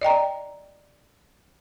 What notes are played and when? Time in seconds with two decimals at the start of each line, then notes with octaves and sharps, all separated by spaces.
0.01 D5 D#5 G5 A#5